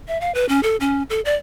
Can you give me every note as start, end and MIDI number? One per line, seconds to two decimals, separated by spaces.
0.08 0.20 76
0.21 0.33 77
0.35 0.47 71
0.49 0.62 61
0.63 0.76 69
0.80 1.03 61
1.10 1.21 69
1.25 1.35 74